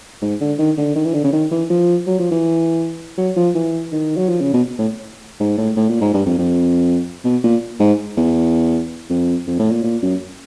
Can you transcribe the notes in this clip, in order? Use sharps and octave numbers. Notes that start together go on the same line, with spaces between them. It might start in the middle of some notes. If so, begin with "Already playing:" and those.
G#2
D3
D#3
D3
D#3
E3
D3
C#3
D#3
E3
F3
F#3
F3
E3
F#3
F3
E3
D#3
F#3
F3
C#3
B2
A2
G#2
A2
A2
A#2
G#2
G2
F2
F2
B2
A#2
G#2
E2
F2
F2
A2
A#2
A#2
F#2